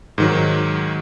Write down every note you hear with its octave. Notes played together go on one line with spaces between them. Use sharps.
G#2 D#3 F#3